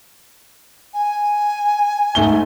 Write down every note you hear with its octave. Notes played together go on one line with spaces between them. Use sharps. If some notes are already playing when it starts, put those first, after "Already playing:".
G#5
G#2 A3 G7